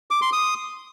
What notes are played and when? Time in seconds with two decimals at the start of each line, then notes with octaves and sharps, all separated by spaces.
0.11 D6
0.22 C6
0.33 D#6